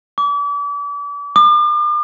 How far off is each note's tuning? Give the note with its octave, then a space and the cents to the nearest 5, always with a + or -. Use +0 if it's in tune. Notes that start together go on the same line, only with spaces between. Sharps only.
D6 -40
D6 +45